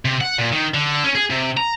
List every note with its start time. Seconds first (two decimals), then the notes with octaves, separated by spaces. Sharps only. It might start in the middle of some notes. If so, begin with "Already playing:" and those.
0.05 C3
0.21 F#5
0.38 A#2
0.52 D#3
0.74 D3
1.04 C#4
1.15 G#4
1.30 C3
1.57 A#5